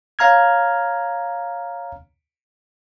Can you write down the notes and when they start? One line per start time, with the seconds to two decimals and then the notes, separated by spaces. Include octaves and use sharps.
0.19 C#5 F5 A#5 F6 G#6